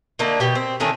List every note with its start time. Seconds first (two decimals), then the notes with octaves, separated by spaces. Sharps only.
0.19 D3 A3 A#3 D#4
0.40 B2 G4 G5
0.55 C4
0.80 D3 D#3 A3 C#4